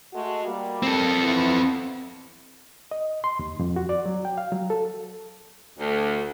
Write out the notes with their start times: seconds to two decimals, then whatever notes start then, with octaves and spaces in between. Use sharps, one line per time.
0.12 G#3 A3 F#4
0.45 G3 A#3
0.83 C4 A4
1.23 E3 B3 E4
2.91 D#5
3.24 C6
3.39 D#2
3.59 F2
3.76 F#4
3.89 D5
4.06 F#3
4.25 G5
4.38 F5
4.52 F#3
4.70 A4
5.78 D2